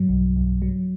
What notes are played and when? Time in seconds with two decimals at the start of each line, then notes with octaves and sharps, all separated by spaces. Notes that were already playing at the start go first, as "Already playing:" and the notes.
Already playing: G2 F#3
0.09 B1
0.36 B1
0.62 F#3